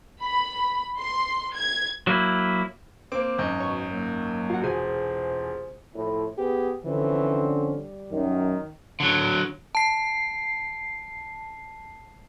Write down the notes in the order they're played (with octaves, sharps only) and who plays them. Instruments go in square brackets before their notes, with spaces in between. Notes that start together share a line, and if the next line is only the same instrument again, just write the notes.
[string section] B5
C6
G#6
[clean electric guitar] F#3 A#3 E4
[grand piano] A#3 C4 [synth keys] D6
[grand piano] G#1 F#2 D#5
[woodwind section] B2 [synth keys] C#5
[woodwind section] D#3 F#3 A#3
[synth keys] F4 F#4
[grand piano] E1 [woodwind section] C3 F4 C5 [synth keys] G#4
[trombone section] A2 F3 E4
[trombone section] B3 G#4 [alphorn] G4
[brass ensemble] D3 [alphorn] E3 [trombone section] F3 C4 C#4
[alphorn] G3
[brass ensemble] F#2 [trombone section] D#3
[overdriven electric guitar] D3 F#3
[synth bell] A5 C7